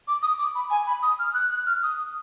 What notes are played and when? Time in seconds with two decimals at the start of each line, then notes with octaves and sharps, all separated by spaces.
0.08 D6
0.22 D#6
0.38 D6
0.55 B5
0.70 G#5
0.87 B5
1.02 D#6
1.19 F6
1.34 F#6
1.51 F#6
1.66 F6
1.83 D#6